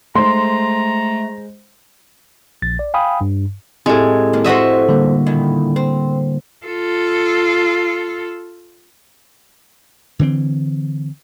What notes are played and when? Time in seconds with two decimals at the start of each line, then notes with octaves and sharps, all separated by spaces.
0.16 G#3 A3 C5 A#5 C6
2.62 A#1 A6
2.79 D5
2.94 F5 G5 G#5 B5 D#6
3.21 G2
3.86 A2 G#3 C4 E4 G4
4.33 D#3 A#3
4.45 F2 F#4 A4 C5 D#5 E5
4.89 D3 G3 A#3
5.26 A#2 D#3 E4
5.76 C4
6.66 F4 A4
10.19 D3 E3 A3 C4